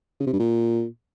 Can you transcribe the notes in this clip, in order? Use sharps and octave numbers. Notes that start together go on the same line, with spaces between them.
C#3
C3
G2
A#2